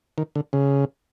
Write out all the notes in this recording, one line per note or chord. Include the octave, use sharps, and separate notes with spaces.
D#3
D3
C#3